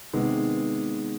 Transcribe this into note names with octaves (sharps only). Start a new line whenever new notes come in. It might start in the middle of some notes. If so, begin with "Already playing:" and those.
C3 D#3 G#3 B3